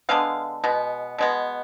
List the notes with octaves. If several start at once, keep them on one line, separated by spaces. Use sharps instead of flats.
D3 G#3 B3 F5
B2 G#3 B3
B2 G#3 B3